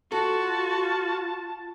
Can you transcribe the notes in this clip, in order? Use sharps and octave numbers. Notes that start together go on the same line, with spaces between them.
F4 F#4 A4 A5